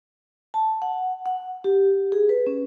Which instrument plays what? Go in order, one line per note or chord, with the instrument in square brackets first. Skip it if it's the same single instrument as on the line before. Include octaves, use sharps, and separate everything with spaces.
[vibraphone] A5
F#5
F#5
G4
G#4
B4
C#4